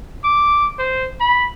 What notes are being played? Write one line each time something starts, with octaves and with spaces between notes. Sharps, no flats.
D6
C5
B5